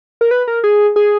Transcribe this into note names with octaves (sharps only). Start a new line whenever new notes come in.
A#4
B4
A#4
G#4
G#4